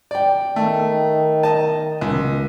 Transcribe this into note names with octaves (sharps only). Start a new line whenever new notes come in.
D5 G5
D#3 A3
D#5 A5
C#2